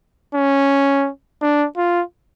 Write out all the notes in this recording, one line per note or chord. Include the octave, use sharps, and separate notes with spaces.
C#4
D4
F4